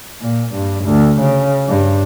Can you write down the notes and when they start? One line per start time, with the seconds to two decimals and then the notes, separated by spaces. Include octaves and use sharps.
0.21 A#2
0.54 G2
0.85 D2
1.20 C#3
1.68 G2